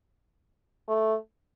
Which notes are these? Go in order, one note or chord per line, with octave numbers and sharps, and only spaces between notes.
A3